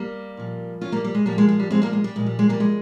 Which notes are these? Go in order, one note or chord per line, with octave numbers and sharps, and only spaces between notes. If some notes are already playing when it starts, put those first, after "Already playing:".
Already playing: G3 A#3
A#2 F3
C#4 F4
G3 A#3
G3
G#3
A#2 F3 G3 A#3
G#3
G#3
G3
G#3 C4
G3 A#3
G#3
G3
A#2 F3 G#3
G3
G#3
G3 A#3
G#3